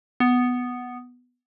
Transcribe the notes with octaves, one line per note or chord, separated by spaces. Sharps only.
B3